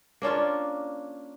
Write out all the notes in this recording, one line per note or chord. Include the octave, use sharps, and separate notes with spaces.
A#3 C#4 D4 F4